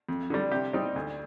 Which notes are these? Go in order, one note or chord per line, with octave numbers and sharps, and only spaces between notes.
F2
D3 G3
C3 G4
G3 C4 D#4
D2